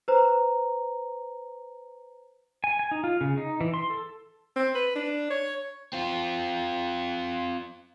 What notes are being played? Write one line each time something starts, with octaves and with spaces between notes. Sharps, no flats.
B4 C5 A#5
G#5
G#5
D#4
F4
C#3
D#4
E3
C6
A4
C4
B4
D4
C#5
C4 F4